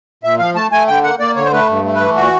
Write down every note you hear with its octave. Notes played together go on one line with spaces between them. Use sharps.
A#2 E5
F3 F5
A3 A5
A3 G#5
D3 G5
A#3 F#5
A#3 D5
D3 C#5
C5
A3 B4
G2
A3
B4
E3
A#2 F#4